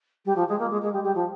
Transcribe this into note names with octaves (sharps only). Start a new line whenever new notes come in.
G3
F3
G#3
A#3
G#3
G#3
G3
G3
F3